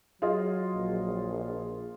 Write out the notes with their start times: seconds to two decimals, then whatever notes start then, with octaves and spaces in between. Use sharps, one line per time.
0.22 F#3 F4 G#4 D#5
0.74 A#1